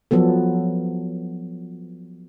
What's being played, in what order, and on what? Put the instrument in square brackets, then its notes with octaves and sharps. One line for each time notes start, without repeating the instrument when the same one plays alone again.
[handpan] F3 F#3 B3 A4